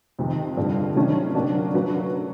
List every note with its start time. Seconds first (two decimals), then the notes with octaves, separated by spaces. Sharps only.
0.19 F2 C3 D#3
0.57 G2 D3 F3 A3
0.96 C3 D#3 F#3 A3 C#4
1.35 F#3 A#3 D4 F#4 A#4
1.74 F#3 A3 C#4 F#4 B4